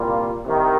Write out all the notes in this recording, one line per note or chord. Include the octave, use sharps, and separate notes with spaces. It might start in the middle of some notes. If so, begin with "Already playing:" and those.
Already playing: C2 A#2 G3 A#3 F4
C2 C3 D#3